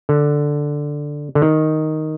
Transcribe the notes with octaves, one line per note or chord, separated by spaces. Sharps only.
D3
D3
D#3